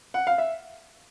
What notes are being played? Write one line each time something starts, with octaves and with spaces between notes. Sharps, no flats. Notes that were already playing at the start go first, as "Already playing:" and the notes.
F#5
F5
E5